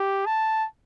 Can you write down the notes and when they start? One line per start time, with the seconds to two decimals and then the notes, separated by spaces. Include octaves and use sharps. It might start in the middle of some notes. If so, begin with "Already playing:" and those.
Already playing: G4
0.26 A5